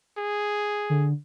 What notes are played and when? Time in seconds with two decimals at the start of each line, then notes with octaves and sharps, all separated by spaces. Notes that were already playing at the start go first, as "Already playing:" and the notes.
0.17 G#4
0.89 D3